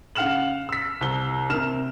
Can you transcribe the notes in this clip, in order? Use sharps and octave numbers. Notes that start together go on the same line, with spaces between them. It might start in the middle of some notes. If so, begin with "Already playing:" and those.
C#3 F5 F#5 F6 E7 F#7
E6 B6
C2 G7
C3 A#4 F6 E7